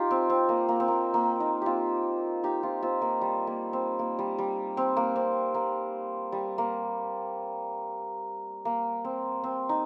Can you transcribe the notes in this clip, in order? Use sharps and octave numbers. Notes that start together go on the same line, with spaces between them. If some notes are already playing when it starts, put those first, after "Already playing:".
Already playing: D#4 F4 G4
C4
C4
A#3
A#3
C4
A#3
A#3
D#4
C4 F4 G4
D#4 G4
C4 F4
C4 F4
A#3
G3
A#3
C4
A#3
G3
G3
C4
A#3
C4
A#3
G3
A#3
A#3
C4
C4
D#4